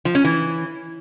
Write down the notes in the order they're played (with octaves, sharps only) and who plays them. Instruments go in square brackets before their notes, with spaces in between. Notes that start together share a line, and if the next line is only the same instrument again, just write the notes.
[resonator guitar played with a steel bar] F3
C#4
E3